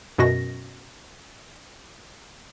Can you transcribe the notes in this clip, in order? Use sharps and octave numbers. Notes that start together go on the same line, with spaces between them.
F#2 B2 F#4 A#6